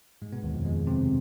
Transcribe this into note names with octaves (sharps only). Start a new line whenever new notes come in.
G#2 G#3
B2 B3
D#2 D#3
F2 F3
G#2 G#3
C3 C4